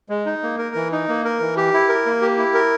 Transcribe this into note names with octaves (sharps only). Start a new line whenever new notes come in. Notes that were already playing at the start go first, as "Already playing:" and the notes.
G#3
D#4
A#3
A#4
E3
D#4
A#3
A#4
E3
G4
E4
A#4
A#3
G4
E4
A#4